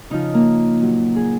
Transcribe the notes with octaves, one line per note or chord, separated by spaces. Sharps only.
C#3 F3 D#4
A#3
A#2 F#3
G#4